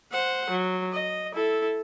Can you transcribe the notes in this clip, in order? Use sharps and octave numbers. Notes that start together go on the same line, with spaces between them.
C5 F#5
F#3
D#5
E4 A4